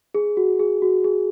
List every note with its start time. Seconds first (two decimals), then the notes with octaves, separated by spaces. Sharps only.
0.14 G#4
0.37 F#4
0.59 G#4
0.82 F#4
1.04 G#4